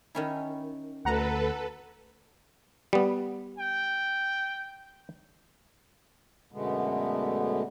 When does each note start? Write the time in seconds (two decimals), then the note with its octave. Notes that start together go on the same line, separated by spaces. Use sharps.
0.15 D#3 C#4 E4
1.05 D2 A4 B4 F#5 A#5
2.93 G3 B3
3.58 G5
6.52 F#2 B2 D3 G#3 A3 B3